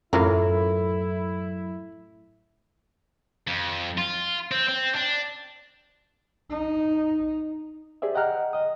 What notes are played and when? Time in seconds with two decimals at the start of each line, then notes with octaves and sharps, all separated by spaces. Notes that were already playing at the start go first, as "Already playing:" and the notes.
0.13 F#2 A2 E3 E4 F4 A#4
3.47 F2
3.98 F4
4.51 C4
4.68 C4
4.95 D4
6.50 D#4
8.02 G4 G#4 C5 D5 E5
8.15 D#5 F#5 G5 A#5 F6 F#6
8.53 D#5 D#6